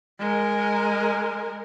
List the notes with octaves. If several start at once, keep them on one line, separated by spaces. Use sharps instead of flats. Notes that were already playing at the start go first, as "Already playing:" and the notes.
G#3 A#4